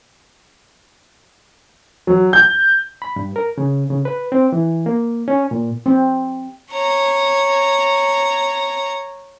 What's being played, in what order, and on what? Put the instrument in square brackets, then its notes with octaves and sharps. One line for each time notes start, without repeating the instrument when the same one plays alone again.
[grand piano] F#3
G6
[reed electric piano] B5
G2
A#4
C#3
C#3
B4
C4
E3
A#3
C#4
A#2
[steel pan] C4
[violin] C#5 A#5